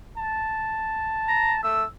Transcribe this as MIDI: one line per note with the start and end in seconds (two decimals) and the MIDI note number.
0.17 1.63 81
1.28 1.53 82
1.63 1.84 57
1.63 1.85 88